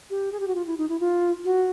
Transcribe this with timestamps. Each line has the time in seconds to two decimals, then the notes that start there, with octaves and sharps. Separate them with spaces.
0.10 G4
0.32 G#4
0.40 G4
0.48 F#4
0.55 F4
0.67 E4
0.78 D#4
0.89 E4
1.00 F4
1.45 F#4